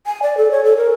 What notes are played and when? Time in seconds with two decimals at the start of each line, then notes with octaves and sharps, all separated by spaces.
0.06 G#5
0.22 D5
0.37 A4
0.51 C#5
0.64 A4
0.77 A#4